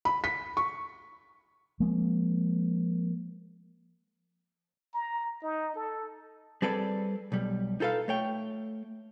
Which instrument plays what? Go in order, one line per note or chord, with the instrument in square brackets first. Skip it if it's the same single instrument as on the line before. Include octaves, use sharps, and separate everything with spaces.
[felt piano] B5
B6
C#6
[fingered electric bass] F3 G#3 A#3 C4
[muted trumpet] A#5
D#4
A4
[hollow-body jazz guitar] G3 C4 G#4 A4 B4 D5
B1 G3
D#4 F4 A4 B4 F5
A3 C#5 G5